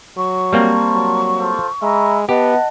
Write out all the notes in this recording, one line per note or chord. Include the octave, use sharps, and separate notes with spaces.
F#3 C#6
G3 A#3 C4 A#4 C5 A5
F#3
F4 A4 C5
G#3 E5 A#5 B5
B3 G4 D#5 F#5 A5